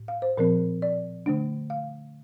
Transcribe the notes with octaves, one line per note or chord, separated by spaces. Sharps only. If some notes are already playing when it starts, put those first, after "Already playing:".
Already playing: A2
F5
C5
A#2 F3 C4 A#4
D5
D3 A3 D4
F5